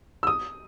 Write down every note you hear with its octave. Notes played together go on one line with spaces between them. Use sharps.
E6
D#6